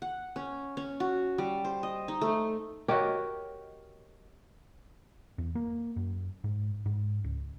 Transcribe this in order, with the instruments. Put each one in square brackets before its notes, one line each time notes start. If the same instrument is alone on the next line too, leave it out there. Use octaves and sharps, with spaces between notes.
[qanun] F#5
C#4
C#4
F#4
G3
C5
D#5
D#4
A3
[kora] F#4 G4 [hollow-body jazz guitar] A#4 C#5 D#5
[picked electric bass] E2
A#3
F#2
G#2
G#2
C#2